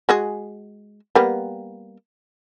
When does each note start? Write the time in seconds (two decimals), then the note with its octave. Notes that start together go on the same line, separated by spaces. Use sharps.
0.09 G#3 F#4 G#4
1.15 G3 A#3 B3